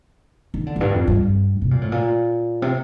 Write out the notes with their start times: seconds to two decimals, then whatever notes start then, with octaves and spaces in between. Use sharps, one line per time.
0.54 D#3
0.67 D3
0.76 F2
0.81 G2
0.94 F2
1.07 G2
1.62 C3
1.71 A#2
1.81 A2
1.92 A#2
2.62 C3